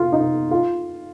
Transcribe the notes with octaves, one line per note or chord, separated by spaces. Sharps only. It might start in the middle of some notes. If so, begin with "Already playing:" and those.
Already playing: F4
D#4
F4